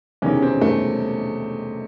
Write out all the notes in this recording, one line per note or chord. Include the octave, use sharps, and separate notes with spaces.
E1 E2 C3 D#3 C#4
C4
A3